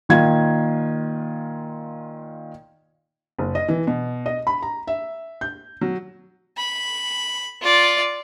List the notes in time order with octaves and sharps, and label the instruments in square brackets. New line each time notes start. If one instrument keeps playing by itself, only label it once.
[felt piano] A#2 D#3 F4 G#6
F#1
D#5
E3
B2
D#5
B5
A#5
E5
G6
F#3
[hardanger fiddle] B5
F4 D5